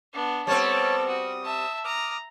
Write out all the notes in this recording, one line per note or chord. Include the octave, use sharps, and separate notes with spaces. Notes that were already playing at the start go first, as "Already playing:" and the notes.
B3 D4
G3 B3 C4 A4 C#5 A5
F#4 D#6
E5 A5
A#5 D6 D#6 F6